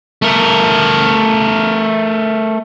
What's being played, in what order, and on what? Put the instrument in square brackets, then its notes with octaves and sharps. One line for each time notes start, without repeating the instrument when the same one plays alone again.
[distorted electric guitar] A3 A#4